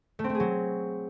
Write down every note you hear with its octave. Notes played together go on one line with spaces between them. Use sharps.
A3
C4
A3
G#4
F#3